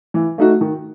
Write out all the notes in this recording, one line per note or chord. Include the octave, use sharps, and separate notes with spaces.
E3
A3 D#4 F#4
D#3